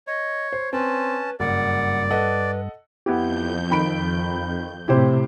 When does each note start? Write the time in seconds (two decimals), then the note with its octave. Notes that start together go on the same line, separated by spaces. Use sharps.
0.07 C#5 D#5
0.53 C5
0.73 C4 C#4 B4 A5
1.40 F#1 G2 D5 F#5
2.10 A4 B4 D#5 F#5
3.06 F2 B3 E4 G4 G6
3.71 D#3 B5 D7
4.88 A2 C3 E4 G4 C5